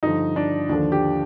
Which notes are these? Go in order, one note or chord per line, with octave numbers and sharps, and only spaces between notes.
G2 D3 F3 D#4
D4
D#2 D3 F3 D4
G4